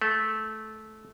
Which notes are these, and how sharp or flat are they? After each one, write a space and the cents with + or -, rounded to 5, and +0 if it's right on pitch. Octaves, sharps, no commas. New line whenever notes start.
A3 -15